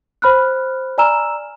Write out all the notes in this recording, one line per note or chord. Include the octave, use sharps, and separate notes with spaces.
C5 B5 F6 F#6
D5 G#5 A#5 E6 F6 E7